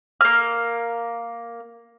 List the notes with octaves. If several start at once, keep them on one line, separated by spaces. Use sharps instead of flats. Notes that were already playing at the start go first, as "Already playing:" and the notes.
A#3 F6